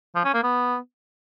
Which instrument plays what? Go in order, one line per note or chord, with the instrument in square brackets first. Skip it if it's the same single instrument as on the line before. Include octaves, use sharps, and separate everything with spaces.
[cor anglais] F3
C#4
A#3
B3